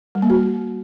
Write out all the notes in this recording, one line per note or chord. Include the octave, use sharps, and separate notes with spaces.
G3
A#3
F#4